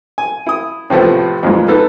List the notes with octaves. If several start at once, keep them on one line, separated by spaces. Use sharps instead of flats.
G#5
E4 D#6
A2 C3 F3 A3 B3
F2 A#2 E3 G#3
B3 D#4 A4